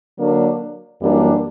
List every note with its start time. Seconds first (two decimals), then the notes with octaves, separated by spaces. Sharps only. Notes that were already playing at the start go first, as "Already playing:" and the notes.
0.19 D3 F#3 A#3 D4
1.02 F#2 E3 G3 A#3 D4